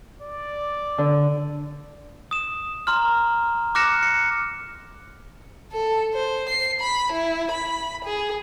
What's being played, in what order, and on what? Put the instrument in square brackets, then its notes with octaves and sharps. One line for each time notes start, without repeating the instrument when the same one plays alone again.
[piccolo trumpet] D5
[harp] D3
[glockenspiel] D#6 E7
A#5 C6 F6
D6 F6 F#6 A#6 C#7 E7
C#7
[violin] A4
C5
C7
B5
E4
B5
G#4